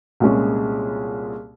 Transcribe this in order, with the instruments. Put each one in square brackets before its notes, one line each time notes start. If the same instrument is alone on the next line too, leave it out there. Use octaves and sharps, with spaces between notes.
[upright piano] C2 A#2 G#3 C#4